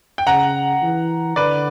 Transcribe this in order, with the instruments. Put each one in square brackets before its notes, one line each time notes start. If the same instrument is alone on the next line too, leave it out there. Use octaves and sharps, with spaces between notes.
[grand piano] G5
[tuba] C#3 [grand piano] F#5 A#5
[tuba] E3
[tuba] D3 [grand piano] B4 D5